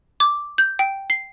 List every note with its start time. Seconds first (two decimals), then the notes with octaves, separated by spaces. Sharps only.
0.20 D6
0.58 G6
0.79 G5
1.10 C7